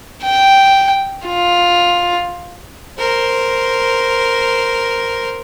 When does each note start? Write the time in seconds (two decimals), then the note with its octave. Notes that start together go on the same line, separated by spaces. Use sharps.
0.23 G5
1.26 F4
2.99 A#4 C5